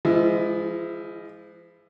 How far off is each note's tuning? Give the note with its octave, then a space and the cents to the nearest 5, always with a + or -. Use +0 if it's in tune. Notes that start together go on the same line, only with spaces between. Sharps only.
F3 -35 G#3 +0 E4 +0